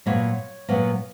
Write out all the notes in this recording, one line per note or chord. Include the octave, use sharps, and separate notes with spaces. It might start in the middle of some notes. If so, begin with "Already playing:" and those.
A#2 F#3 B3 C#5
A#2 F#3 B3